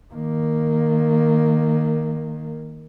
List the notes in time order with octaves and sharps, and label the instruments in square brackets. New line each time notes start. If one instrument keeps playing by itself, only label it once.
[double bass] D#3 A#3